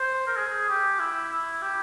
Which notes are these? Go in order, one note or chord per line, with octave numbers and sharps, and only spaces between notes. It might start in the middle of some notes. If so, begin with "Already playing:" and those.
Already playing: C5
A#4
G#4
G4
E4
E4
G4